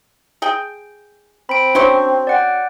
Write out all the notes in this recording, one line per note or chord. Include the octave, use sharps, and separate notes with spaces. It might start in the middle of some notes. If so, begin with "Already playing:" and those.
G#4 G5
C4 B5 D7
F#3 C#4 D4 C5 C#6
D5 F#5 G5